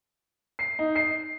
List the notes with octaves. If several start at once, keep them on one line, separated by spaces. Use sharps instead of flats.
C7
D#4
C7